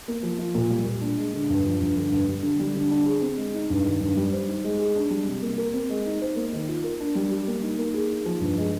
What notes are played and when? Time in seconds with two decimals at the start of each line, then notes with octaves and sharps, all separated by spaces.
0.08 A#3
0.23 F3
0.39 F4
0.55 A#2
0.70 G3
0.85 A#2
1.01 D4
1.17 G#3
1.34 D3
1.50 G2
1.65 F3
1.81 G2
1.97 D3
2.12 G2
2.28 G3
2.43 D3
2.59 G3
2.75 D3
2.91 D4
3.06 G#4
3.21 C4
3.37 G#3
3.54 D#4
3.70 G2
3.85 D#3
4.00 G2
4.17 G3
4.32 C5
4.47 D#4
4.64 G#3
4.79 G#4
4.96 D4
5.10 G3
5.27 C3
5.42 A#3
5.58 A#4
5.74 C4
5.90 G#3
6.06 D#4
6.22 C5
6.36 A#3
6.53 D#3
6.68 F4
6.84 A#4
7.00 D4
7.15 G3
7.32 G4
7.47 A#3
7.62 D#4
7.79 A#3
7.94 G#4
8.10 D#4
8.26 F3
8.41 G2
8.58 G#3